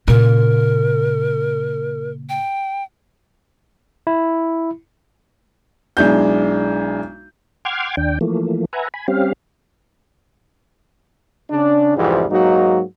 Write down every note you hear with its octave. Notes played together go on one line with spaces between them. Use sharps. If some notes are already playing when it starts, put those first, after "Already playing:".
A#2 C#3 A#4
G5
E4
B1 G#3 D4 E4 G6
F#5 G5 C6 D6 F6 G#6
D#2 D4 G5
E3 F3 A3 A#3
B4 E5 F#5 G#5 A#5
G#5 B5
G3 C4 C#4 G4 F5
C#3 D4
C2 F2 G#2 E3 G3
G#2 F#3 A#3 D#4 F#4